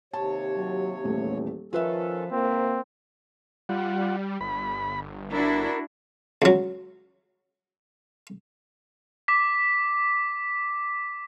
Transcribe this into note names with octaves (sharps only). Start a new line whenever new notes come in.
D#2 C3 C#5 A5
F#3
D#1 E2 A3
D#3 F3 C#4 F4 A4 B4 E5
G#2 A#3 C4
G3 F4 F#5
G1 B5
D4 E4 F#4 A#4
C#2 F#3
D6 B6